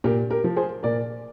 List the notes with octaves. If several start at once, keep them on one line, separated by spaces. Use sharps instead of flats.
A#2 G4 A#4
G4 A#4
F3
G#4 C5
A#2 A#4 D5